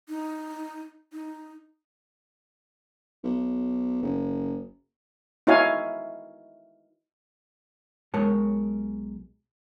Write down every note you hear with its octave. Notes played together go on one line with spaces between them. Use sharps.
D#4
D#4
B1
F#1
D#4 E4 F#4 C#5 F5 G#5
B1 G#3 A#4 C#5 A5